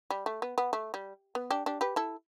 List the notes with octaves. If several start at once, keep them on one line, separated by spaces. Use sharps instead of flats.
G3
A3
B3
B3
A3
G3
B3
D4 G4
D4 G4
G4 B4
E4 A4